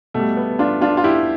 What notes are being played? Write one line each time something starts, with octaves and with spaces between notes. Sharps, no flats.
B2 G3 A3
B3
D4 F4
D4 F4
F4
E4 G4